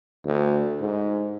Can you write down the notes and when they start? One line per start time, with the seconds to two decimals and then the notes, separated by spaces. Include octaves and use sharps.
0.25 D2
0.81 G#2